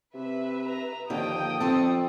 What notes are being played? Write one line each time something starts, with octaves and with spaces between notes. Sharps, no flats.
C3 B4 E5
A#5
D#2 D3 F3 G5 D#6
F2 C4 A4